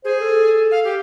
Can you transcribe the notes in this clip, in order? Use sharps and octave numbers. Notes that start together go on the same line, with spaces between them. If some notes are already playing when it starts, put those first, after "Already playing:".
G#4 C5
A4
F5
G4